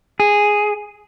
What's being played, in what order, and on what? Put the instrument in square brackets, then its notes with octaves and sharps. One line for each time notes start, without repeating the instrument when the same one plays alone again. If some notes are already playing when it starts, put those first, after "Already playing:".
[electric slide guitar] G#4